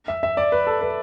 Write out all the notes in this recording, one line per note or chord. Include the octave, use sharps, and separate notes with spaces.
E5
E5
D5
B4
A4
B4